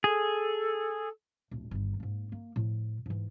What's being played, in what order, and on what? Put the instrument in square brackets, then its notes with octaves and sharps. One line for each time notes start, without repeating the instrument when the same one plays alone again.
[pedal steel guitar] G#4 [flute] A4
[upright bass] D1 A#1
G1 D#3
G#2 A#3
A#3
A2 F3
G#2 E3